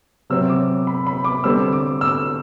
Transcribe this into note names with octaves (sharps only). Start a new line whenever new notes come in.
C3 F#3 C4 E6
D6
B5
B5
D6
D3 G3 C4 E6
D6
E6